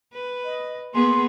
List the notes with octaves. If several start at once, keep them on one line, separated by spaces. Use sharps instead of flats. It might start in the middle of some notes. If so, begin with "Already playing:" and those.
B4
D#5
A#3 B3 G#4 C6